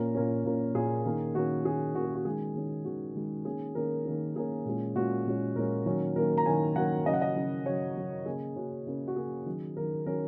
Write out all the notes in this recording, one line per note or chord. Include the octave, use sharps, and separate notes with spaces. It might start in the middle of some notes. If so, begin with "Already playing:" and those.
Already playing: A#2 A#3 C#4 A#4
A#2 A#3 C#4
A#2 A#3 C#4
A#2 A#3 C#4 G#4
D#3 A#3 C#4
D#3 A#3 C#4 F#4
D#3 A#3 C#4 G#4
D#3 A#3 C#4 F#4
G#4
F#4
D#3 G#3 C#4 G#4
D#3 G#3 C#4
D#3 G#3 C#4 F#4
D#3 G#3 C#4
D#3 A#3 C#4 G#4
D#3 A#3 C#4 A#4
D#3 A#3 C#4
D#3 A#3 C#4 G#4
A#2 G#3 C#4
A#2 G#3 C#4 F#4
A#2 G#3 C#4
A#2 G#3 C#4 A#4
D#3 F#3 A#3 C#4
D#3 F#3 A#3 C#4 A#4
A#5
D#3 F#3 A#3 C#4 G#5
D#3 F#3 A#3 C#4 F#5
C#3 F#3 C#4 D#5
F#5
D#5
C#3 F#3 C#4
C#3 F#3 C#4 C#5
C#3 F#3 C#4
C#3 A#3 C#4 G#4
C#3 A#3 C#4 F#4
C#3 A#3 C#4
F#4
C#3 A#3 C#4 G#4
D#3 F#3 C#4
D#3 F#3 C#4 A#4
D#3 F#3 C#4 A#4